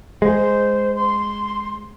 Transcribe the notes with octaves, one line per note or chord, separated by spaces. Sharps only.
G#3 C5
C6